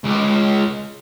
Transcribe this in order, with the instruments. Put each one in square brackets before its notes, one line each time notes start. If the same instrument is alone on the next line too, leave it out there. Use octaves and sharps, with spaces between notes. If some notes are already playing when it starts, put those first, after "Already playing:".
[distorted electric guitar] C#2